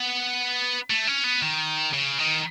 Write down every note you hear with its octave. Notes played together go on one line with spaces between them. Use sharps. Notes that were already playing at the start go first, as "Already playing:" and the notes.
Already playing: B3
A3
C#4
B3
D#3
C#3
D#3